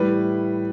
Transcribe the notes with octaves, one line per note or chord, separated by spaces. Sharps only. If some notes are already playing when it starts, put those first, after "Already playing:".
Already playing: A2 E3 G3 B4